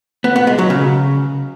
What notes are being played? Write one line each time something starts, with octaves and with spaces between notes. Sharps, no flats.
B3
B3
G#3
F#3
C#3